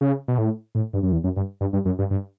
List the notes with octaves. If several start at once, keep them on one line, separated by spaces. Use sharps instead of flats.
C#3
B2
A2
A2
G2
F#2
E2
F#2
G2
G2
G2
F#2
G2
G2